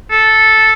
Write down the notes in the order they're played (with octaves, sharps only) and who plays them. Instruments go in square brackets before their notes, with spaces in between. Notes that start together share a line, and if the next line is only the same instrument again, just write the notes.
[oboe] A4